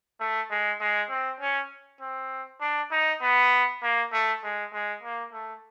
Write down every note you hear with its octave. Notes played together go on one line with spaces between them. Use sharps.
A3
G#3
G#3
C4
C#4
C4
D4
D#4
B3
A#3
A3
G#3
G#3
A#3
A3